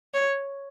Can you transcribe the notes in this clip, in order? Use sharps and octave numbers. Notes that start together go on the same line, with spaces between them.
C#5